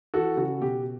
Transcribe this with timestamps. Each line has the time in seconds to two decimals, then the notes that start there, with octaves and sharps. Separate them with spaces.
0.14 E3 F#4 A4
0.37 C#3 F#4
0.61 B2 G4